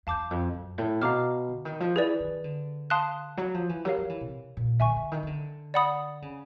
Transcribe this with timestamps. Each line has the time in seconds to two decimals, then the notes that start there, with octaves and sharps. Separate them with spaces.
0.07 E2 F5 A5 D6 G6
0.31 F2
0.54 F#2
0.78 A2
1.01 B2 F5 A#5 D6 F6
1.49 D3
1.65 D#3
1.80 F3
1.95 E3 G#4 B4 D5
2.20 D#3
2.44 D3
2.90 F5 A5 C6 D#6 F#6
3.37 F#3
3.54 F3
3.69 E3
3.85 F#3 G4 A#4 C#5 F5
3.97 F3
4.09 E3
4.21 C3
4.57 A#2
4.80 D3 E5 G#5 C#6
4.96 D3
5.12 D#3
5.23 D#3
5.27 D3
5.74 D5 F#5 B5 D#6
6.22 C#3